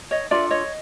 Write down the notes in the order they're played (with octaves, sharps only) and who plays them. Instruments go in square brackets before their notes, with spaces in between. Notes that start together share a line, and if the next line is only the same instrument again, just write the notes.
[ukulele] C#5 D#5
D4 F4 A4 D5 E5
C#5 D#5